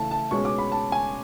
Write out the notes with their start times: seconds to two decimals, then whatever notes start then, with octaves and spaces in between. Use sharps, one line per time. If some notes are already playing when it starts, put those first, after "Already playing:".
Already playing: C#3 E3 A3 A5
0.11 A5
0.31 B2 G#3 C#4 C#6
0.45 D6
0.58 B5
0.72 A5
0.92 G#5